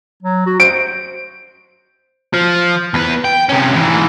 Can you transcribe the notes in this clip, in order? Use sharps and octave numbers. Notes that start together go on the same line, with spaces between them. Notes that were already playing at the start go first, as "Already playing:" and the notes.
F#3
F#4
C5 D7
F3
E2 B4
G5
C3 C#4
G#2 E3